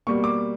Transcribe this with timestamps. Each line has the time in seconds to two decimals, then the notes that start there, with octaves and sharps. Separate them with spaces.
0.07 B2 G3 A#3 C#6
0.24 D6